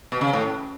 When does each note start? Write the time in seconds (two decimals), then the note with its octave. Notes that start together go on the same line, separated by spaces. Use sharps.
0.12 B2
0.21 C#3
0.33 A2